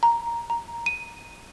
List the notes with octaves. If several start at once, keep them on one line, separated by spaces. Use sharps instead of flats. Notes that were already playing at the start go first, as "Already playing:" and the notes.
A#5
A#5
D#7